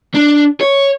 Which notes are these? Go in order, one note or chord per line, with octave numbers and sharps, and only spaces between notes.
D4
C#5